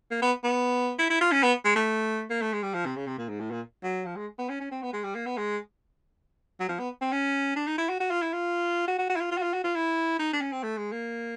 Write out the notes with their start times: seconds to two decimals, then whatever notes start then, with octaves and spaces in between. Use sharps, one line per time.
0.11 A#3
0.22 B3
0.44 B3
0.99 E4
1.10 E4
1.21 F4
1.32 C#4
1.43 B3
1.65 G#3
1.75 A3
2.30 A#3
2.41 A3
2.53 G#3
2.63 G3
2.74 F3
2.85 C3
2.96 C#3
3.07 C3
3.18 A#2
3.29 G#2
3.40 A2
3.51 A#2
3.83 F#3
4.06 F3
4.16 G#3
4.39 B3
4.49 C#4
4.60 C#4
4.71 C4
4.82 B3
4.93 G#3
5.04 G3
5.15 A#3
5.26 B3
5.37 G#3
6.60 F#3
6.69 F3
6.79 B3
7.01 C4
7.12 C#4
7.56 D4
7.67 D#4
7.78 E4
7.89 F#4
8.00 F#4
8.11 F4
8.22 E4
8.33 F4
8.88 F#4
8.99 F#4
9.10 F#4
9.16 E4
9.20 F4
9.31 F4
9.38 F#4
9.42 F4
9.53 F#4
9.64 F4
9.76 E4
10.19 D#4
10.33 D4
10.41 C#4
10.52 C4
10.63 A3
10.77 G#3
10.92 A#3